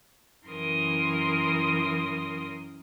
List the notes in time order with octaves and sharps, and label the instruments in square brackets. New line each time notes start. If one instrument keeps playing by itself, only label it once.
[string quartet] F#2 E3 A#4 C6 D#6